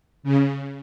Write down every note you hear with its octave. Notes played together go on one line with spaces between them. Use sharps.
C#3